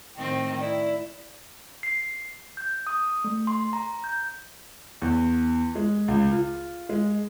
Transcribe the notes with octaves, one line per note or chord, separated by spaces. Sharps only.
A2 D#3 C4 G5
E4 D5
C7
G6
D#6
A3
C6
A#5
G6
E2
G#3
C#2
F4
G#3